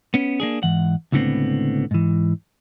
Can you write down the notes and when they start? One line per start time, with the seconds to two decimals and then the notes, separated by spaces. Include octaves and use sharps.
0.14 B3 C#4
0.40 A#3 D4 G#4
0.63 G#2 E3 F#5
1.12 C#2 A2 D3 G#3 B3 C4
1.91 G#2 E3